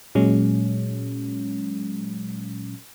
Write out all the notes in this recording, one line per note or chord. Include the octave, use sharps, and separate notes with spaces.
A#2 F#3 G#3 C#4